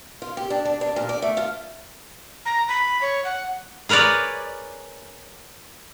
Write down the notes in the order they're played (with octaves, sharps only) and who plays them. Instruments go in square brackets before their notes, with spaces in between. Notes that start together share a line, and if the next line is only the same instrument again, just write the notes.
[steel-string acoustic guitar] F4
G4
D4
D4
D4
A#2
D5
A3
F4
[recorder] A#5
B5
C#5
F#5
[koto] G#4 A#4 B4 C#5 D5